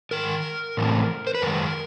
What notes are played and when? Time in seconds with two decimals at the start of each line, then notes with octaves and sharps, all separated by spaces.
0.11 G#2 D#3 A#4
0.77 A2 E3 A3 C4
1.27 C5
1.35 B4
1.42 F#2 D#3 G#3 A#4